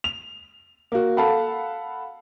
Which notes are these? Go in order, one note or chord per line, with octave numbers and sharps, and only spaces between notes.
F7
A#3 F#4
A4 F5 F#5 A5 B5